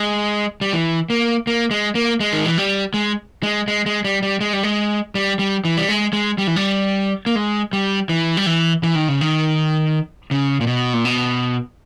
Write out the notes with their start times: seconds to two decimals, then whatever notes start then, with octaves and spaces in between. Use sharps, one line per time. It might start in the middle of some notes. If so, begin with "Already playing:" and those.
Already playing: G#3
0.61 G3
0.73 E3
1.10 A#3
1.47 A#3
1.71 G#3
1.95 A#3
2.20 G#3
2.33 D#3
2.45 E3
2.58 G3
2.94 G#3
3.43 G#3
3.68 G#3
3.86 G#3
4.05 G3
4.23 G3
4.41 G#3
4.53 G3
4.63 G#3
5.15 G3
5.39 G3
5.65 E3
5.77 G3
5.89 G#3
6.13 G#3
6.38 G3
6.47 E3
6.56 G3
7.26 A#3
7.36 G#3
7.73 G3
8.09 E3
8.37 G3
8.46 E3
8.83 E3
8.95 D#3
9.08 C#3
9.21 D#3
10.31 C#3
10.61 A#2
10.67 B2
10.93 A#2
11.05 B2